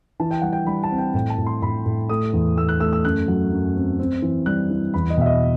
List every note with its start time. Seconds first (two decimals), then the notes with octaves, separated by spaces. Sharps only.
0.20 E3 A5
0.31 G5
0.42 G3 F#5
0.53 G5
0.67 G3 B5
0.83 A5
0.91 C4
0.98 G5
1.14 A2 G5
1.30 A5
1.38 A2
1.46 C6
1.62 A2 B5
1.86 A2
2.09 A3 D#6
2.33 E2
2.56 A3 E6
2.69 F#6
2.80 A3 E6
2.93 E6
3.04 F#2 F#6
3.28 F#3
3.52 F#2
3.75 C4
3.99 C4
4.22 E3
4.46 G3 F#6
4.70 E3
4.94 E2 B5
5.10 D#5
5.18 B2 E5
5.26 D#5